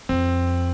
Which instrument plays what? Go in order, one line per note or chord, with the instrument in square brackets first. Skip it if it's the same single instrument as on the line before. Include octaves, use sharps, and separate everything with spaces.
[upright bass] F2 [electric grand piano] C4